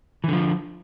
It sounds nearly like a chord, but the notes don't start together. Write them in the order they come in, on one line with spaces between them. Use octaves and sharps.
E3 D3 F3